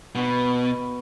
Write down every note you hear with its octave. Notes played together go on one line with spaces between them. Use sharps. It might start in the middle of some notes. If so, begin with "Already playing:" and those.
B2 B3 F#4 B5